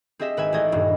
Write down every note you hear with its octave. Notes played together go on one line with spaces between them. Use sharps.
C4 G4 G#4 D#5 E5
G#1 B4 E5 G#5
A1 G4 D5 D#5 G#6
D#1 G2